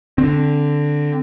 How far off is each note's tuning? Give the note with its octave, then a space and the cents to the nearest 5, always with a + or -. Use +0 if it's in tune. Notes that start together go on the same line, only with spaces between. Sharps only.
D3 +0 C4 +10